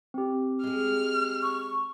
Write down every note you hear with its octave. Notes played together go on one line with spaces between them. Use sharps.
C4 G4
G#3 G#4 F6
C#6